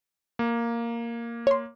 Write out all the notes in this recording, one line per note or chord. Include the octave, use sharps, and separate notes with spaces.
A#3
C#5 C6